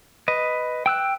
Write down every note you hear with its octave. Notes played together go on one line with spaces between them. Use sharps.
B4 D#5
G5 E6 F#6